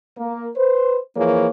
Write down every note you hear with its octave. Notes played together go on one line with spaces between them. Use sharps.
A#3
B4 C5
E3 F3 A#3 G#4 C#5